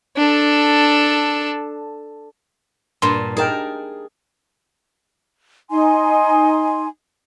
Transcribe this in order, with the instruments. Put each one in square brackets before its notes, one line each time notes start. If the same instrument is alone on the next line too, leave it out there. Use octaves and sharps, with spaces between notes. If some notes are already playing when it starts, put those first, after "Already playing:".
[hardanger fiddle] D4 A4
[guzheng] G2 A#2 [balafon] C6
[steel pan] D#4 A#4 G5 [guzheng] G#4 A5
[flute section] D#4 G#5 C6